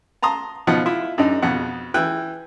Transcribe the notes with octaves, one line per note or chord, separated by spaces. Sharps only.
A5 A#5 C6 D#6
B2 F3 D#4 D#5 F#5
E4 F4 E5
F#2 D4 D#4
F2 B2 F#5
E3 G5 F#6